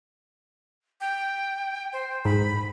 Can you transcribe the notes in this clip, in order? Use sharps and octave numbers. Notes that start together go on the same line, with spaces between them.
G5
C5
G#2 B5